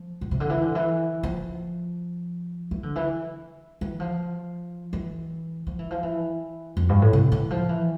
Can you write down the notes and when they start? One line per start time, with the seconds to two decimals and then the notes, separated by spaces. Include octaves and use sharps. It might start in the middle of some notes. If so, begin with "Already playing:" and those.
Already playing: F3
0.21 A#2
0.31 C3
0.40 D3
0.49 E3
0.61 D3
0.75 E3
1.23 F3
2.71 E3
2.83 D3
2.96 E3
3.81 E3
4.00 F3
4.93 E3
5.67 F3
5.79 E3
5.91 F3
6.03 E3
6.77 F2
6.89 G2
7.02 A2
7.13 C3
7.32 E3
7.50 F3
7.69 E3